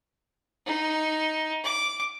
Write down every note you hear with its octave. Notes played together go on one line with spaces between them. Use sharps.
D#4
D6